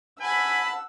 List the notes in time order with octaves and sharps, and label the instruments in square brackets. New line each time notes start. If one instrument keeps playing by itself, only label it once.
[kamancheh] F#5 E6 [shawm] G#5 [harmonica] A5 [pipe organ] B5